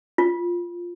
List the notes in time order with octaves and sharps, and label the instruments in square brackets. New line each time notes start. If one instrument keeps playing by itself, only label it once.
[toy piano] F4